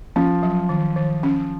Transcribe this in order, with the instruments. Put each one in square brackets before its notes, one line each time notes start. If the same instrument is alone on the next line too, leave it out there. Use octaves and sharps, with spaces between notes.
[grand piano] F3 [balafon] C#4
[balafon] F#3
D#3
D#3
C#4